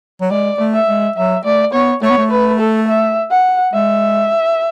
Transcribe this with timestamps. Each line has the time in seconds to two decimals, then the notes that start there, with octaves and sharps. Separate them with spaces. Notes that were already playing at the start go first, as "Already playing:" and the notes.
0.21 F#3
0.30 G#3 D5
0.59 A3
0.74 E5
0.88 G#3
1.16 F#3 E5
1.45 A3 D5
1.73 B3 C#5
2.02 A3 C#5
2.10 B3
2.18 A3
2.31 B4
2.59 A4
2.88 E5
3.30 F#5
3.73 G#3 E5